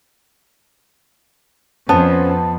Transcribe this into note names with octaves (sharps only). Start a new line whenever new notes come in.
F2 B3 C#4 B4 C5 A5